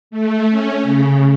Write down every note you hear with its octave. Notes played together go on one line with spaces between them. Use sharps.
A3
C#4
C#3